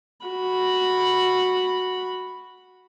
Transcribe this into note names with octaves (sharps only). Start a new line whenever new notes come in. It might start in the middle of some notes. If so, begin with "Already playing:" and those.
F#4 B5